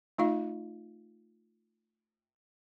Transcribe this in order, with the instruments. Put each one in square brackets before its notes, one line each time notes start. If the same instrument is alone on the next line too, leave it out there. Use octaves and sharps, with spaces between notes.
[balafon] A3 D#4 F4 F5